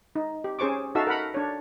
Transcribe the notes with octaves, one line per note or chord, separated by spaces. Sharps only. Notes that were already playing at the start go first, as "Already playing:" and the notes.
D#4
G4
C#4 G#4 C5 C#6 D6
D#4 F#4 A4 E5 F5 E6
A#4 F#5 B5
D4 C#5